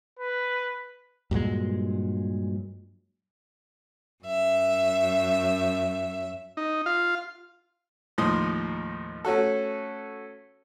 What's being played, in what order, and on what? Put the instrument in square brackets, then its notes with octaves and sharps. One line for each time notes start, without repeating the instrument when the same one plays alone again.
[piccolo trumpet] B4
[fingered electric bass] G2 A#2 F#3 G#3
[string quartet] F#2 E5
[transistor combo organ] D#4
F4 F5
[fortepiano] D#2 A2 F3 D#4 C6 D#6
A3 C#4 F#4 A4